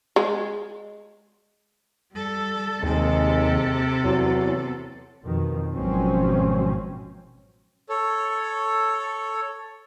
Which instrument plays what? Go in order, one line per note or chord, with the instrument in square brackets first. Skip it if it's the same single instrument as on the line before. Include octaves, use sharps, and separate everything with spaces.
[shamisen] G#3
[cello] G3 A4
[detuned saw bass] D#2 [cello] C3 A4 [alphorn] G#3
[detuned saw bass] E2 [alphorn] F#3
[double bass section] F2 B2 D#3
G#1 B2 F3 F#3 C4 C#4
[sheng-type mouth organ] A4 C#5